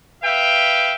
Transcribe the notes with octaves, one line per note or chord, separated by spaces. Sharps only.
B4 E5 F5 G5